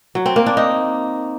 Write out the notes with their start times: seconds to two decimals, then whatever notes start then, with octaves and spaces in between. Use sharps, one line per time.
0.15 F#3
0.26 C4
0.36 A#3
0.46 D4
0.57 D#4